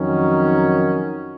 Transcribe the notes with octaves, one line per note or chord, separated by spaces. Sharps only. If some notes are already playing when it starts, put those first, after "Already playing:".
Already playing: F2 D#3 F#3 C#4